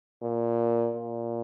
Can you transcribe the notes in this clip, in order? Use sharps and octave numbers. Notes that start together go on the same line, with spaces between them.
A#2
A#2